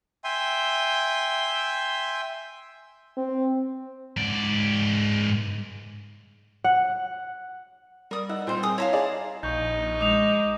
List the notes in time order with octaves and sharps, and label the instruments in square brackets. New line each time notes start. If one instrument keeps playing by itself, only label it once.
[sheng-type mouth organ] E5 G5 G#5 C6
[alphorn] C4
[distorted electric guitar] G#2 D5
[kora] F#5
[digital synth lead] G3 [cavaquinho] A#4 D#6
[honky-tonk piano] D#4 E6 [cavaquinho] F#5
[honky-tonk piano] A#2 C4 [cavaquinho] D#4 C5
[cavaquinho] G#4 A#4 D#6 [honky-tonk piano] C6
[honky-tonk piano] E4 [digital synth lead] C#5 [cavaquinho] F5 A5 A#5
[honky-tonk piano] D#4 G#4 D5
[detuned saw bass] A#1 [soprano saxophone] D#4 [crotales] C#6 G6
[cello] G#3 [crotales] D6 D#6 F7